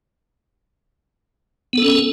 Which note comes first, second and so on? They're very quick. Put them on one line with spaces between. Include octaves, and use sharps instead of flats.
B3 A4 C#4